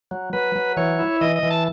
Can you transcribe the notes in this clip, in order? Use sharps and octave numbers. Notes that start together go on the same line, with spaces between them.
F#3
F#3 B4
F#3
E3 C#5
E4
E3 D#5
D#5
E3
A5